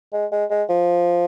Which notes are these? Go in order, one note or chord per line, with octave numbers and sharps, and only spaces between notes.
G#3
G#3
G#3
F3